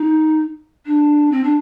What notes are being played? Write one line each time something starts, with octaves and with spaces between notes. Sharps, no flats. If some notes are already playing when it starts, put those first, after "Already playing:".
Already playing: D#4
D4
C4
D4